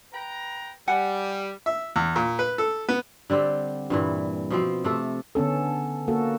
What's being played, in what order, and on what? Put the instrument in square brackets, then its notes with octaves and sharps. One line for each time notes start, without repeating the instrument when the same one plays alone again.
[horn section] B4 G5 A#5
[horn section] G3 [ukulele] F#5 G#5
[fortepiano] E5
E2
A#2
B4
A4
B3
[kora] D3 G3 C4 G4
G2 A#2 E3
B2 F3 C4
C3 A3 A4
[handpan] D3 B3 C#4 A4
A#3 F#4 A4